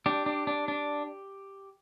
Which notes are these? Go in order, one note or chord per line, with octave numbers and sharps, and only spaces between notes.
D4 G4
D4
D4
D4